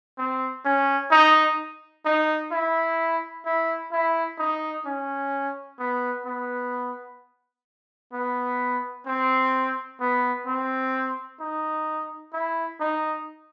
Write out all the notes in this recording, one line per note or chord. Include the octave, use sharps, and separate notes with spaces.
C4
C#4
D#4
D#4
E4
E4
E4
D#4
C#4
B3
B3
B3
C4
B3
C4
D#4
E4
D#4